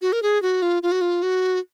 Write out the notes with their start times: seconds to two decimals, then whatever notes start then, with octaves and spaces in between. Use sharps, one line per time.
0.02 F#4
0.13 A#4
0.23 G#4
0.42 F#4
0.62 F4
0.83 F4
0.92 F#4
1.01 F4
1.23 F#4